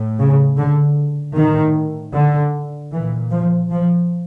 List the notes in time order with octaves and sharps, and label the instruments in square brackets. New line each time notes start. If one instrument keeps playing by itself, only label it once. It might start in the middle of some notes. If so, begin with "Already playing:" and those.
Already playing: [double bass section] A2
C#3
D3
A2 D#3
D3
A#2 E3
F3
F3